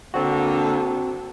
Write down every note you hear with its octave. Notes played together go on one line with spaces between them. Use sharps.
D3 A#3 C4 F#4